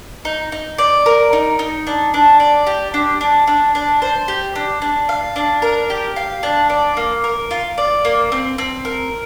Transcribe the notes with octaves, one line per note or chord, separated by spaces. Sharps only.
D#4
D#4
D5
A#4
D#4
D#4
D4
D4
D5
G4
D4
D4
D4
D4
C5
G4
D4
D4
F5
D4
A#4
G4
F5
D4
D5
A#3
A#4
F4
D5
A#3
C4
C4
A#4